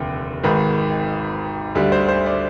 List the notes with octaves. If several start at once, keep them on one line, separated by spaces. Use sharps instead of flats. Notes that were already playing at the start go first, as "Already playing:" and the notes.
Already playing: F1 D#2 D3 C4
G#1 G#2 D#3 B4
D2 D3 G3
C5
C5
D5